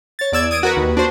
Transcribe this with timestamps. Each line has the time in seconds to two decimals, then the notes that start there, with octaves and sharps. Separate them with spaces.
0.19 C#5 A6
0.32 E2 D5 E6 G#6
0.51 D#6 G#6 D7
0.63 F#4 A#4 B4
0.77 D#2
0.97 D4 F#4 C5